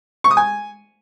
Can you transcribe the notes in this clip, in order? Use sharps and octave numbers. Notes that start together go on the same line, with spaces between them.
C#6
D#6
G#5